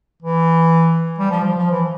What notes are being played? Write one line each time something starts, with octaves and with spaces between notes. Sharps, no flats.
E3
G3
F3
F3
F3
E3